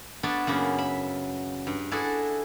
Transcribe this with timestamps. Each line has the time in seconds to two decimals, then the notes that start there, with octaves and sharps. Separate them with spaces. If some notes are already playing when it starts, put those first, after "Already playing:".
0.23 B3 D4 C#5 E5 A5
0.47 F#2 C#3 A#3 B3
0.78 E5 B5
1.67 G2
1.91 D4 E4 F#4 G#4 A4